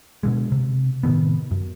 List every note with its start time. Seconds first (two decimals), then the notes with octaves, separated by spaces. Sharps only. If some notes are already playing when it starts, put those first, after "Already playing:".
0.23 B2 D3 G#3
0.52 C3
1.03 A2 C3 D#3 B3
1.51 F#2